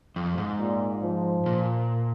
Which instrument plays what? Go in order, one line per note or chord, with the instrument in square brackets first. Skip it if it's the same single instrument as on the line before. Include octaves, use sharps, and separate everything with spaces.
[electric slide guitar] F2
G#2
[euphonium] A#2
F3
[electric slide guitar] A#2